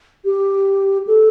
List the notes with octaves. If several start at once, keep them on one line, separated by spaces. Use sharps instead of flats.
G4
A4